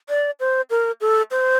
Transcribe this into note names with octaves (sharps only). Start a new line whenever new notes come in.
D5
C5
A#4
A4
C5